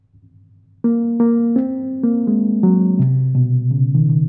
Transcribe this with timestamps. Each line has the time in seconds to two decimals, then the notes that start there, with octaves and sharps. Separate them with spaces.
0.84 A#3
1.20 A#3
1.56 C4
2.04 A#3
2.27 G#3
2.63 F#3
2.99 C3
3.35 B2
3.71 C#3
3.95 D#3
4.09 D#3